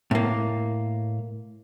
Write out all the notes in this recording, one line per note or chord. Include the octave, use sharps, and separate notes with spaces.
A2 A#3